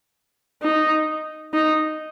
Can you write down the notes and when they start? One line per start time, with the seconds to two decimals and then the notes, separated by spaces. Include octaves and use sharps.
0.63 D#4
1.53 D#4